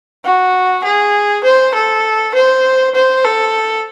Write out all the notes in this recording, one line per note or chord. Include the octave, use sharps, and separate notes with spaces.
F#4
G#4
C5
A4
C5
C5
A4